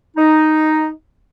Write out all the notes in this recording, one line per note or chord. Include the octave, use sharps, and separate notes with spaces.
D#4